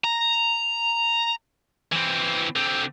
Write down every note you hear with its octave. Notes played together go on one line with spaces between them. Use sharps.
A#5
E3 C4
D3 C4